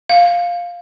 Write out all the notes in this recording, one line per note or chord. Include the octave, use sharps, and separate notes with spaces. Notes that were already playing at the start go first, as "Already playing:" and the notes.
F5